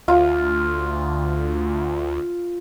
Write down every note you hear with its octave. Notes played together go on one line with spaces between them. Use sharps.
D2 F4